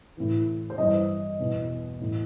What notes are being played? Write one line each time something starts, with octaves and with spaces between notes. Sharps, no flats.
A2 E3
C5
G2 E3 D#5
E2 B2
A2 E3